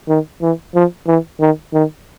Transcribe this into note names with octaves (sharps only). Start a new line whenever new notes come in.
D#3
E3
F3
E3
D#3
D#3